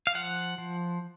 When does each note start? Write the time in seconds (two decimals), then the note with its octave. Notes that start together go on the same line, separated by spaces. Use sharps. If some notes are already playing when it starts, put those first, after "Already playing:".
0.07 F5
0.15 F3 F#5
0.58 F3